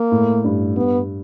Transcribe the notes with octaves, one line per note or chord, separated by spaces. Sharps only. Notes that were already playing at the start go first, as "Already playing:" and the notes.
Already playing: A#3
A2
G2
G2 B3